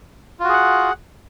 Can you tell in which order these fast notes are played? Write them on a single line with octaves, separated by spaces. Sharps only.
F4 F#4 G#4 F#5